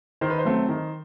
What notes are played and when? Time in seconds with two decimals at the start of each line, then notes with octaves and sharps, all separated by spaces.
0.21 D#3 C5
0.30 B4
0.38 C5
0.45 F#3 A3 C4
0.69 D#3